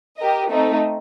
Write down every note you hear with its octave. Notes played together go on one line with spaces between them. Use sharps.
G4 A#4 D#5
A3 C4 D#4 A4